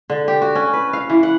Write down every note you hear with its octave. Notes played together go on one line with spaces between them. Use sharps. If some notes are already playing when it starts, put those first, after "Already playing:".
D3
G4
F#4
C#4
B4
F5
E3
F#5